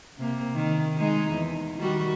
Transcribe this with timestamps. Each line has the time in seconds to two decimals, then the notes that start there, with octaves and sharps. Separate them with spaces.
0.18 C3 A#3
0.56 D#3
0.98 G#3 D#4
1.32 E2
1.79 D#3 G3 F#4